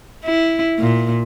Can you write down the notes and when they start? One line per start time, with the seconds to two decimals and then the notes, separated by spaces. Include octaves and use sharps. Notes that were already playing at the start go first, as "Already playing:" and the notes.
0.25 E4
0.79 A#2